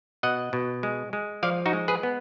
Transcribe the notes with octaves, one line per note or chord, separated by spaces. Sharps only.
B2 D#5 F#5
B2
G#3
G#3
F3 D5 F5
D#4 F#4
G#3
G#4 B4
B3